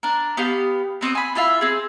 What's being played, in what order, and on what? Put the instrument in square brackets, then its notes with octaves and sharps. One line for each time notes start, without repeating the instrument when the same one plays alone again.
[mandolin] D4 A#4
B3 G4 F5
B3 C4 C#5 D#5
G#5 B5
E4 F4 E5 F5
C4 G#4